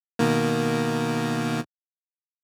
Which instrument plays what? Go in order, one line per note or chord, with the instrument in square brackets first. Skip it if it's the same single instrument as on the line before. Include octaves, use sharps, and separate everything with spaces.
[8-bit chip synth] B2 D#3 A#3